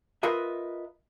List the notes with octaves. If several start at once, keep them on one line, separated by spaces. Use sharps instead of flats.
F4 A#4 B4 D#5 E5